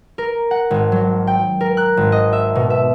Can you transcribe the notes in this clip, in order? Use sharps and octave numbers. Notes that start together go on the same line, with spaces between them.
A#4
F#5
G#1
F#3
G5
A#4
F#6
G#1
D#5
E5
B2
E5